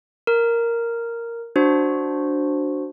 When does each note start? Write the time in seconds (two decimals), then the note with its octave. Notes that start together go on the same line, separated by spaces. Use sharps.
0.27 A#4
1.56 D4 F#4 C5